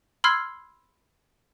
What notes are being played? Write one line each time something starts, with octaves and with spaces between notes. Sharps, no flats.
B5 C6 E6 F6 G#6 C7